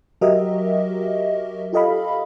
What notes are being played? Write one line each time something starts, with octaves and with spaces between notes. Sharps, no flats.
F#3 F#4 G4 A#4 D#5 E5
F4 G4 A4 D#5 F5 B5